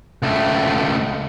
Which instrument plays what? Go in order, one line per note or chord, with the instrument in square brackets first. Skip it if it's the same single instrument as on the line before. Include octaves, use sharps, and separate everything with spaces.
[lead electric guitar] C#2 A3